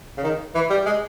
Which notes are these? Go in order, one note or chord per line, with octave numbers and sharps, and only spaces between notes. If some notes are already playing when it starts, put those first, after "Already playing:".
C#3
D#3
E3
G3
G#3